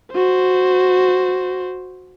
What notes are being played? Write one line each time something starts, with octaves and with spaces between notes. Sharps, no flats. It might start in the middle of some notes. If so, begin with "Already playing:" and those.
F#4 C5